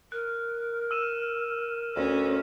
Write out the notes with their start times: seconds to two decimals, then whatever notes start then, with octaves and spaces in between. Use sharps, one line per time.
0.12 A#4 F#6
0.91 E6 D#7 E7
1.96 D2 C#4